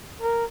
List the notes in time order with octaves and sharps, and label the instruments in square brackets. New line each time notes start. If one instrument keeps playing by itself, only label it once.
[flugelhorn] A#4